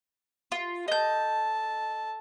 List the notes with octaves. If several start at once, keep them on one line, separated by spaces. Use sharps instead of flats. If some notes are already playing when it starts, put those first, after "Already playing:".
F4
A4 D#5 A5 G6